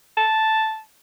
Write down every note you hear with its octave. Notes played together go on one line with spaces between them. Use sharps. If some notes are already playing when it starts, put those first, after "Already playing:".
A5